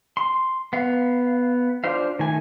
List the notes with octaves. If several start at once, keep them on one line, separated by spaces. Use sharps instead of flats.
C6
B3 F5
D4 F4 C5 F5
D#3 A3 G#5